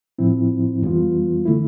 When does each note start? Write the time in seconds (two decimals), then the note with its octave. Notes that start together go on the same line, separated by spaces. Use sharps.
0.18 A2 F3 C4 E4
0.82 F2 E3 G3 B3 F4
1.46 D3 A3 E4